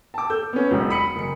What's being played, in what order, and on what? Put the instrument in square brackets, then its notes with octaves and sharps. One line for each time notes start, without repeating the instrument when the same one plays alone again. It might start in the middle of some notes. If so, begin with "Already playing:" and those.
[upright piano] A5 D6
A4 E6 G6
B3 C#4
E1 B1
B5 D#6 B6 C#7 F#7
F#1 C#7